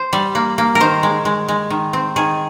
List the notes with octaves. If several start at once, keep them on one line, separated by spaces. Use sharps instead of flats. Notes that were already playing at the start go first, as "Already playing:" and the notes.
Already playing: C5
G3
A#3
A#3
A#4
D#3 C5
G#3
G#3
G#3
D#3
C4
D#3 G#4